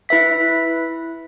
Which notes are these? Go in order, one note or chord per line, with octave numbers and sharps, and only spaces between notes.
E4 B4 E5 B6